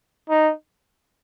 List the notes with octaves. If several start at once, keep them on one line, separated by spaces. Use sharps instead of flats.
D#4